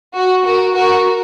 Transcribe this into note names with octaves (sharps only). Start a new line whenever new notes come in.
F#4
F#4 A#4
F#4 A#4